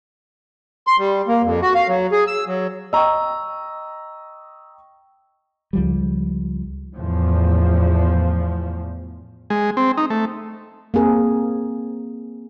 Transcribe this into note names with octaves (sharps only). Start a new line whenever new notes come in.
C6
G3
A#3
F2
F#4
F5
F#3
G#4
E6
F#3
D#5 G5 A#5 C#6 E6
C#2 F3 G3
E2 A2 F3
G#3
C4
D#4
A3
A#3 C4 G#4 A#4